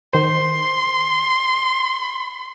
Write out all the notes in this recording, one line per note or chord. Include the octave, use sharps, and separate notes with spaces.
D#3 C5 C6